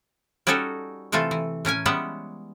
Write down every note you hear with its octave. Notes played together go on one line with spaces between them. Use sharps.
G3 C#4 D#4 F#4 A4 C#5
C3 E3 A3 F4 A4
E3
A2 C#4 A#4 G#5
G3 G#3 B3 C#4 E5 F#5